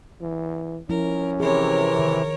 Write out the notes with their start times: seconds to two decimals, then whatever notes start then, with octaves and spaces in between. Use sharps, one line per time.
0.21 E3
0.89 F3 C#4 E4 A#4
1.40 C3 E3 G#4 A#4 C#5
1.99 D#3